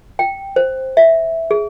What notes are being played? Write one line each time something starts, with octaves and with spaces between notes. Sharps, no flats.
G5
C5
E5
G#4